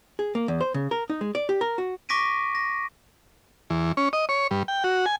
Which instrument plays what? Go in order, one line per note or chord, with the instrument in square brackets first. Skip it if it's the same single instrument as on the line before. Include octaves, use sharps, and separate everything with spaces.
[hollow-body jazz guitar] G#4
A#3
E2
C5
C#3
A#4
D#4
G#3
D5
G4
A#4
F#4
[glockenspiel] C#6 D6 A#6 B6 D7 D#7
A#6
[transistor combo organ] E2
C#4
D#5
C#5
G2
G5
F#4
G#5